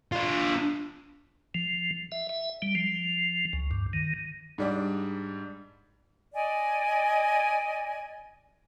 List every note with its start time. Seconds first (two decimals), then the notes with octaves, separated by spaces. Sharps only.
0.12 D4 F4
1.55 F3
2.12 E5
2.29 E5
2.62 G3
2.75 F3
3.53 C#2
3.71 G2
3.93 D#3
4.58 G#2 G3 D4
6.34 D5 D#5 G#5